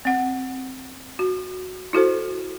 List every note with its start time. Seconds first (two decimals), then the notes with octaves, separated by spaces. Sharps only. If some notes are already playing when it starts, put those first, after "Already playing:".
0.05 C4 F#5
1.19 F#4
1.93 E4 F#4 A4 C5